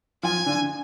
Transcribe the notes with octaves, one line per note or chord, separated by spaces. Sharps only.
F3 F4 G#5
D3 D4